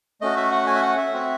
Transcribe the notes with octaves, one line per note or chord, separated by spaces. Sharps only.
A3 C#4 F#4 D#5
E5
F#5
G#5
E5
F#5
E5
C4 F#4